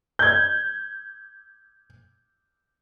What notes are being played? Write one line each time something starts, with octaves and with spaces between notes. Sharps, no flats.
G6 G#6